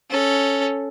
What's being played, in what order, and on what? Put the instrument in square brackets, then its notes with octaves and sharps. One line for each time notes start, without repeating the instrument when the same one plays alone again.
[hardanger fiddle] C#4 A4